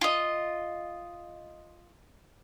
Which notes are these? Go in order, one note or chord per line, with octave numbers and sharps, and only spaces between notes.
F4 D#5